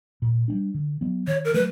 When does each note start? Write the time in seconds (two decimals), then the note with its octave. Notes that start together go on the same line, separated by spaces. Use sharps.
0.22 A#2
0.48 G3 B3 D4
0.74 D3
1.01 F#3 B3
1.27 D#3 C#5
1.45 A#4
1.54 F#3 A3 B4